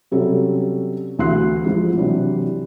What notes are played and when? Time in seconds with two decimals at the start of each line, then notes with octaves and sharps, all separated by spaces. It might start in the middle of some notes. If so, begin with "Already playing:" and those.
0.11 C3 F#3 G3 C#4 A4
1.19 D2 E3 F#4 C6 F#6 C7
1.65 G#2 F3 G#3
1.98 C3 E3 F#3 D4